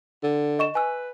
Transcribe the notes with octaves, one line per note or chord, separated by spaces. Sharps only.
D3
D#5 C#6 E7
B4 G#5 E6